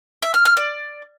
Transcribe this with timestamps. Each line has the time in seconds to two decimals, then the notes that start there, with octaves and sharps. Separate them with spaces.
0.22 E5
0.34 F6
0.45 F6
0.57 D5